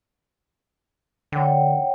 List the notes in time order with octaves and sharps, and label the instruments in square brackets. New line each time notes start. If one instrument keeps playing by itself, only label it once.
[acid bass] D3 [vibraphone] C#5 F#5 G5